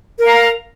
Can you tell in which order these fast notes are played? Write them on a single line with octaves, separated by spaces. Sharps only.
A#4 F5 A#5